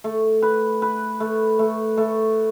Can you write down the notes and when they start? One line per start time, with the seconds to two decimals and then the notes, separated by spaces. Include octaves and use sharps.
0.04 A3
0.42 B4
0.82 B4
1.20 A3
1.59 A3
1.97 A3